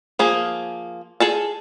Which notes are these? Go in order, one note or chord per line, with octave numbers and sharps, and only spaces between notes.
F3 A#3 G#4
G#4 A4 A5